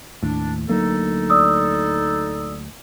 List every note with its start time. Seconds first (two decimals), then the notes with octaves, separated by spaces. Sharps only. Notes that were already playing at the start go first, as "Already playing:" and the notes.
0.23 D#2 A2 D4
0.69 D2 F#3 A#3 D#4 A4
1.30 D5 D#6 E6